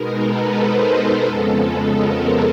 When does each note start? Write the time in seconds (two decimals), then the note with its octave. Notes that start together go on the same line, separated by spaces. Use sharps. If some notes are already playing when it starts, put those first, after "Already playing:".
Already playing: B2 G#3 B3 D#4 A#4
0.19 A4 B4
0.53 A#4 C5
0.88 A4 B4
1.22 F2 C#3 F3 G#3 B3 A4
1.92 A#4